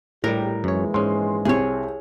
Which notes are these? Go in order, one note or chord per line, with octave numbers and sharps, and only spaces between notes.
A#1 A2 G3 G4 A#4
A#1 F#2 E3 G#3 C#5
G#2 C#4 C6
C2 C4 G#4 C#5